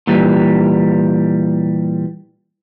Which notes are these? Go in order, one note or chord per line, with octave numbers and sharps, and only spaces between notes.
A#2 E3 G3